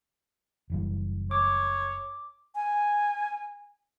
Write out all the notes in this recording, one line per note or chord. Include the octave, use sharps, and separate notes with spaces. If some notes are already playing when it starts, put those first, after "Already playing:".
F#1 E3 G3
C#5 D6
G#5